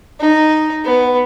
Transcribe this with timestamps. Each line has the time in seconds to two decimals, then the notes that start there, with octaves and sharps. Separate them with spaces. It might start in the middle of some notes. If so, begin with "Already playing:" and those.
0.20 D#4
0.85 B3